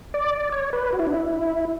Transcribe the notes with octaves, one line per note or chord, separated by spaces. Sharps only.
D5
C#5
B4
F#4
E4
D4
E4